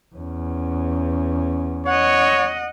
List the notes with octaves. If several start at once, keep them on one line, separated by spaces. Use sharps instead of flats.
E2 C#4
C#5 D#5 F#5